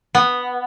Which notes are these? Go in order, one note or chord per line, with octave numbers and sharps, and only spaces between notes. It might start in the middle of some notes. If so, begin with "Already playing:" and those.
B3